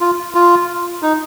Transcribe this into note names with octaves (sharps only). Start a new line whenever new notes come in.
F4
F4
D#4